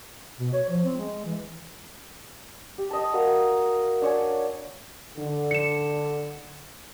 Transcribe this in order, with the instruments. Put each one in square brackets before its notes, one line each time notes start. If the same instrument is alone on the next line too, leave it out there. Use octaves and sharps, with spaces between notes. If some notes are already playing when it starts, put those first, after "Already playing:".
[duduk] B2
C#5
F3
C4
G#3
E3
[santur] G4
D#5 A5
F#4 A#4 F5
D4 C#5 G#5
[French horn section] D3
[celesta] C#7 E7